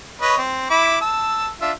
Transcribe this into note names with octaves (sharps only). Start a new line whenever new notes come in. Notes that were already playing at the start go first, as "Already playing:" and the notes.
B4 C#5 D#5
C4
E4 B5 D6
A5 E6
D4 F4 E5